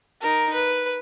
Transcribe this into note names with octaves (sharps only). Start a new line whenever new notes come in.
D#4 A#4
B4